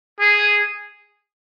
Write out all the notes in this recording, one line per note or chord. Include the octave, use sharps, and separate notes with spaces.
G#4